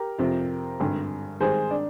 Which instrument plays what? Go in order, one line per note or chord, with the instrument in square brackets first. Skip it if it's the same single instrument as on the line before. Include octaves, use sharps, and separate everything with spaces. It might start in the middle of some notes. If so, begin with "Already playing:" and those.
Already playing: [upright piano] G4 A#4
[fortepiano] F2 C3 F3 C4 F4
G#1 G2 D3
[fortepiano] G#2 D#3 G3 C4 [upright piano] G#4 C5
[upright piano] D4